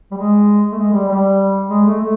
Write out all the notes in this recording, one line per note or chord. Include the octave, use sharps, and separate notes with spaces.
G3
G#3
A3
G#3
G3
G3
G#3
A3
A3